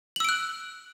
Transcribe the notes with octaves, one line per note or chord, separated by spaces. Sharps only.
E6 F#6 D7 F#7